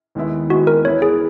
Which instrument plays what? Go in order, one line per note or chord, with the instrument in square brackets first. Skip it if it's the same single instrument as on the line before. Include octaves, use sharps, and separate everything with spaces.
[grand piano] D#2 D#3 G#3 B3 E4
[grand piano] D#2 D#3 G#3 B3 E4 [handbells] F#4
[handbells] A#4
[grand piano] E3 B3 E4 B4 [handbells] C#5
[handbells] G#4